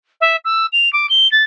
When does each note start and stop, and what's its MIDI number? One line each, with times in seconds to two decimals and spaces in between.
0.20 0.36 76
0.44 0.66 88
0.72 0.91 101
0.93 1.06 86
1.09 1.30 103
1.31 1.42 93